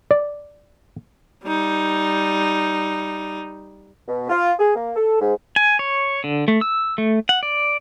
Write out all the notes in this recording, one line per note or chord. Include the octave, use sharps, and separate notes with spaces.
D5
G3 D#4
B2
F4
G#4
A#3
A4
G#2
G#5
C#5
D3
A3
E6
A3
F#5
D5